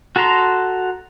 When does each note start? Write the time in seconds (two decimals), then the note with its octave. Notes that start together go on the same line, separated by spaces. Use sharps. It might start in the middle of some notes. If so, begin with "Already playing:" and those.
0.16 F#4 A4 A5 A#5 C6